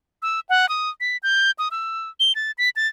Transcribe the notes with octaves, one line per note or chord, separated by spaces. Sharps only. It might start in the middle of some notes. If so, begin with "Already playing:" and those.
E6
F#5
D#6
B6
G6
D#6
E6
G7
A6
B6
A6